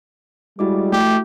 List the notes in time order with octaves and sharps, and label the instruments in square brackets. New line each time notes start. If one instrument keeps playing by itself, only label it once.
[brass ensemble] G3 G#3 [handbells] E4 F#4 D6
[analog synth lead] A3 [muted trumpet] G4